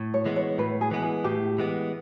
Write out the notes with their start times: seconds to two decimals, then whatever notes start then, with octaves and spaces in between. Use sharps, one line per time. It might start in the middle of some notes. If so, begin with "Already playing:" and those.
Already playing: A2
0.14 C#5
0.25 E3 G#3 B3
0.36 C#5
0.58 A2 B4
0.81 G#4
0.91 E3 G#3 B3
1.03 G#4
1.24 A2 G4
1.58 E3 G#3 B3